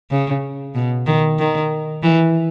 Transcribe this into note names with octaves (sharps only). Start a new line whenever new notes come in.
C#3
B2
D#3
D#3
E3